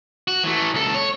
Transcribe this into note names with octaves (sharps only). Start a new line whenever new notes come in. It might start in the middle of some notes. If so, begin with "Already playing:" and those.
F#4
E3 A3
C#2 A4
C#5